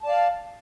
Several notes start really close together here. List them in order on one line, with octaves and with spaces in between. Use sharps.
A5 D5 F5